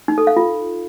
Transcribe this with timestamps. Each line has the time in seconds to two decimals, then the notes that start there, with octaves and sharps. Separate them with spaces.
0.08 D#4
0.18 A4
0.27 F5
0.37 F4